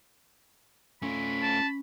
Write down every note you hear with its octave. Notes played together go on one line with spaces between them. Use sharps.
A3 C#4 F4 B5
A5